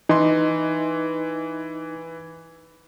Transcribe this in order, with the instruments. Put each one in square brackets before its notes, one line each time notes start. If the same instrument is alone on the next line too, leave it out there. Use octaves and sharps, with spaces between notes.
[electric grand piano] E3 C6 [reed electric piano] D#4